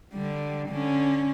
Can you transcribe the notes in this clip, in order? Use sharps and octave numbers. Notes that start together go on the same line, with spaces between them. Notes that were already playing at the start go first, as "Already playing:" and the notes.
D3 G3
D3 C#4